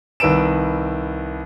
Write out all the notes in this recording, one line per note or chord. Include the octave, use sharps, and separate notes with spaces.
C2 D#3 B4 E6 D7 E7